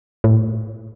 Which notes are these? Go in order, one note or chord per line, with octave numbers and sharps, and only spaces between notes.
A2